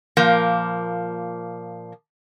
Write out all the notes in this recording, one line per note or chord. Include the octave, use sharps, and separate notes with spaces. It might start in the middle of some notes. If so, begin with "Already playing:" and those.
A#2 F3 A#3